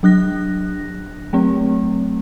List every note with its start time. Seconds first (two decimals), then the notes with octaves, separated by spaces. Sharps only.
0.03 F#3 D4 F#6 A#6
1.33 F#3 A3 C4